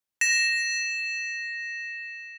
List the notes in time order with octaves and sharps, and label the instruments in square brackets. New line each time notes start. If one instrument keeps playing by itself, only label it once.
[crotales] A#6 E7